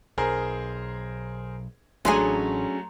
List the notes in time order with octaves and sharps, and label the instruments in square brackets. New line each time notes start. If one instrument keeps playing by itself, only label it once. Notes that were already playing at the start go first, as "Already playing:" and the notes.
[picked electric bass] B1 [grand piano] G#4 A#4 C5
[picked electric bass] A1 [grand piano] F#3 A3 [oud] C#4 D4 G#4 [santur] A#5 C6